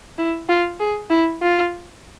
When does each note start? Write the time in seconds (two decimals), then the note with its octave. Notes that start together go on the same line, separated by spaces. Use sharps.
0.18 E4
0.49 F4
0.80 G#4
1.10 E4
1.42 F4